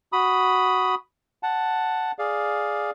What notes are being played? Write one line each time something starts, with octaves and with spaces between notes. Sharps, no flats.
F#4 B5 D#6
F#5 A5
G#4 D5 F5